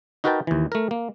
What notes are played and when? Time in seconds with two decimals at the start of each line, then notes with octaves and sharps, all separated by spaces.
0.24 D#4 F#4 A#4 B4 G5 A5
0.47 D#2 E3
0.72 A3 A#4
0.91 A#3